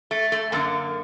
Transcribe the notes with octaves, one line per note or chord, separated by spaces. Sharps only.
A3
A3
F#2 D3 A#3